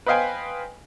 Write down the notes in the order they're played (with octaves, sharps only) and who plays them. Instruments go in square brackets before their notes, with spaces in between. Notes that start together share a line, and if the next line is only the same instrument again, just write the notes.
[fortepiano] B4 C5 D#5 F5 G5 G#5